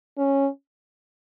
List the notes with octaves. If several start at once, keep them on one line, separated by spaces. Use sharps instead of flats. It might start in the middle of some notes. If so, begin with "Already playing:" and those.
C#4